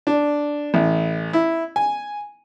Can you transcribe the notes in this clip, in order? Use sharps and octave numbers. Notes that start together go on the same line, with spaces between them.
D4
A1
E4
G#5